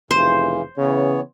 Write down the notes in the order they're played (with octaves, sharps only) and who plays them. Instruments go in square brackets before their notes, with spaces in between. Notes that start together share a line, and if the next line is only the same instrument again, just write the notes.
[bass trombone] F1 [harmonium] C#3 E3 [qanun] C5
[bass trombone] C#3 [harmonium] E3 B3 C#5